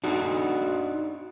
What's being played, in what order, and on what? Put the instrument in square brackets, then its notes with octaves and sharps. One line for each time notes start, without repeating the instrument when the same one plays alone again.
[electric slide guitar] D4 D#4 F#4